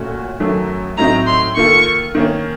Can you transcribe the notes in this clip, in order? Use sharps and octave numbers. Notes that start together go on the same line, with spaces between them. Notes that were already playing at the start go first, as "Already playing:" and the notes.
Already playing: A#2 A3 C#4 F#4
F#2 D#3 F#3 A3
A2 F#3 C4 D#4 A#5
C6
D#3 A#3 F4 A4 C#6
D#3 A#3 C#4